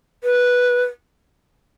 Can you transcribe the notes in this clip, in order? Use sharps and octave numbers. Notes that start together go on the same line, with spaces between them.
B4